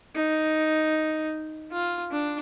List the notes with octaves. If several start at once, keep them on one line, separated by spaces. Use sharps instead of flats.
D#4
F4
D4